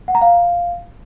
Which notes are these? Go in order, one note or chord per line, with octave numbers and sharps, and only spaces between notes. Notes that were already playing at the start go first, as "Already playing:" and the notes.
F#5
A#5
F5